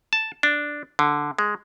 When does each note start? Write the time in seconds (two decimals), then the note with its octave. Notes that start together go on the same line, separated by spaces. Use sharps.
0.13 A5
0.43 D4
0.99 D3
1.39 G#3